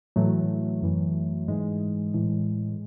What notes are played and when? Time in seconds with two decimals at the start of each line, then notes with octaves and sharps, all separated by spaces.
0.16 A2 E3 F#3 A3
0.82 F#2 E3
1.48 G#2 E3 G#3
2.14 A2 E3